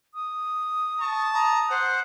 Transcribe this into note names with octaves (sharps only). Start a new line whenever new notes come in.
D#6
A5 C#6
A#5 D#6
C5 F#5